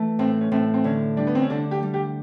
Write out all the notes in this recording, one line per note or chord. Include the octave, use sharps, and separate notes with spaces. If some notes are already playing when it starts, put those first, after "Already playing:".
Already playing: E3 A3
A2 C4
C#4
A2 C4
C4
D3 C#4
G3 D4
B3
C4
C#4
D3 D4
G4
G3
G4